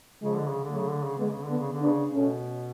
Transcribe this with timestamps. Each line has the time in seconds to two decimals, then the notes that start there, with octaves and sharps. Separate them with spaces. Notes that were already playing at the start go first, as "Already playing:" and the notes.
0.22 C#3 F3 G#3
0.36 D3
0.50 C#3
0.64 D3
0.70 F#3 A3
0.77 C#3
0.91 D3
1.04 C#3
1.17 D3 G#3 B3
1.32 C#3
1.45 D3 B3 D4
1.59 C#3
1.73 D3
1.81 B3 D4
1.86 C#3
2.12 B2 A3 C#4